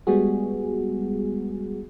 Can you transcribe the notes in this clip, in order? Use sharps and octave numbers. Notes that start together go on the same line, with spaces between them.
G3 G#3 B3 F#4 G#4